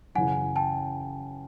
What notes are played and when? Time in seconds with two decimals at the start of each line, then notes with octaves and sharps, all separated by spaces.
0.15 F#2 C#3 E3 F#5 G#5
0.56 G5 A5